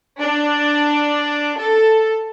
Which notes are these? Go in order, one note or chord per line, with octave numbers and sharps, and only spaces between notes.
D4
A4